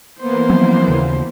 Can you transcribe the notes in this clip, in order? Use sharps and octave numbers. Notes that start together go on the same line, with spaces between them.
E3 A#3 B3 C5
F3 F#3 C4
D#2 C#3